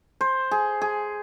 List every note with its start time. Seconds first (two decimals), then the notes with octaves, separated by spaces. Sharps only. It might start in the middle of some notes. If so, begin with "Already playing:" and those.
0.21 C5
0.51 G#4
0.82 G#4